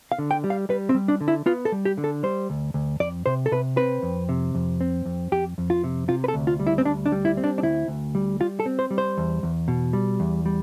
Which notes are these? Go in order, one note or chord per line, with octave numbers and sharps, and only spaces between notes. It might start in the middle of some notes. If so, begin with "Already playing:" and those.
F5
D3
G5
G3
F5
G3 B4
C4
G3
D4
D3
E4
B3 F4
A4
G3
G4
D3
A4
G3 C5
D2
D2
F2 D5
C3 C5
A4
C3 B4
C4 B4
F2
C3
F2
C4
F2
F2 G4
F2
F4
C3
C3 F4
B4
A4
D2
F4
G3
E4
C4
D2 D4
D4
G3
E4
C4
D4
D4
D2 E4
D2
G3
G3 F4
A4
C4
C5
G3
C5
E2
E2
B2
G3
E2
G3